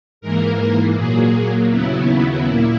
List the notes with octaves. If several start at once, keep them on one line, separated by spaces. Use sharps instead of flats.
G#2 E3 A#3 A#4
A#2 F#3 A#3 G#4
D#2 C#3 F#3 B3 E4
A#2 A#3